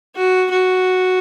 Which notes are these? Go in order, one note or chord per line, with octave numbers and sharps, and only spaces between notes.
F#4
F#4